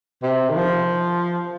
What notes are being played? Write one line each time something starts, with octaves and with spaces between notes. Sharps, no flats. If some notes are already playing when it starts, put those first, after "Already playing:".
C3
D#3
F3